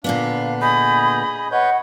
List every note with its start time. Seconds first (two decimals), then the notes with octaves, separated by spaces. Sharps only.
0.04 A#2 D3 B3 D4 F5
0.61 G#4 D#5 B5 G6
1.51 B4 C#5 D#5 F#5 G6